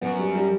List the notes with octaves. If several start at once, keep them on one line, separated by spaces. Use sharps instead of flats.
F#2 B3
G3
G3